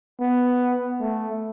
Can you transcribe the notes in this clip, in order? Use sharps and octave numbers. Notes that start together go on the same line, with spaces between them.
B3
A3